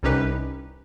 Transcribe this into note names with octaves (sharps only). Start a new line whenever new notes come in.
C2 C3 C#4 D#4 G4 B4